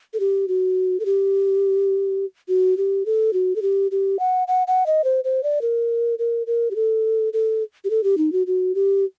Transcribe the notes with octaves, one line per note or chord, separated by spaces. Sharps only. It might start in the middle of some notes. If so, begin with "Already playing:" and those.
A4
G4
F#4
A4
G4
F#4
G4
A4
F#4
A4
G4
G4
F#5
F#5
F#5
D#5
C5
C5
D5
A#4
A#4
A#4
G4
A4
A4
G4
A4
G4
D#4
F#4
F#4
G4